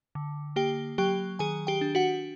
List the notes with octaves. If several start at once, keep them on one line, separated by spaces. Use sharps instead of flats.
D3
A#3 G4 G5
F#3 G4 G5
D#3 G#4 G#5
G4 G5
D4
F#4 F#5